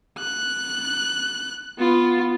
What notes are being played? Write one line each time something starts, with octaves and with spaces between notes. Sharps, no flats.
F#6
B3 F4